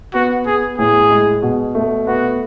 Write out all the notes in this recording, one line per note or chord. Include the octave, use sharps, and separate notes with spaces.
B3 F#4
B3 G#4
A2 G#4
G#3
B2
A3
B3 F#4